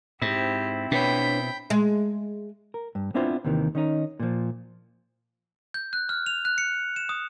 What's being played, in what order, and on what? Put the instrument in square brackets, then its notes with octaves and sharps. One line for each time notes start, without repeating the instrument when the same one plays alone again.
[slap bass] G#2 [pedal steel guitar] C4 E4 [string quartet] G4
[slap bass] B2 [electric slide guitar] D4 B4 C#5 [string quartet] G5 B5
[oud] G#3
[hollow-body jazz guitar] A#4
G2
B3 C4 D4 E4 F4 C5
D#2 C3 D#3 E3
D#3 C#4 D#4
A#2 F3
[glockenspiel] G6
F#6
F6
F7
F#6
C#7
E7
D#6